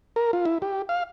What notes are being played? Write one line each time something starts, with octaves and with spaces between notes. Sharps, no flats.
A#4
F4
E4
G4
F5